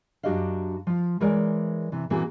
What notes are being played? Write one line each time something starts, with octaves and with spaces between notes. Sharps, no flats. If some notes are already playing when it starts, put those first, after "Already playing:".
F#2 D4 F#4 G4 D#5 F5
F3 F4
E3 G#3 A#4 C#5 D5
C3 E3
A#2 E3 A#3 C4 F#4 G#4